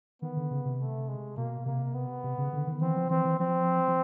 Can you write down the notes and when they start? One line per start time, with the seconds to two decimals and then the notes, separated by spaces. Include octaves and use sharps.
0.22 D#3 B3
0.37 D3
0.51 C#3
0.65 C3
0.79 A3
1.08 G#3
1.37 B2 A#3
1.66 C3 A#3
1.94 B3
2.24 C3
2.38 C#3
2.53 D3
2.67 D#3
2.81 E3 C4
2.96 F3
3.10 E3 C4
3.25 E3
3.39 F3 C4
3.88 F3